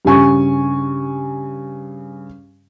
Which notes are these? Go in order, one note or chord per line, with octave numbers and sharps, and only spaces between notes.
G2 C#3 G#5 C#6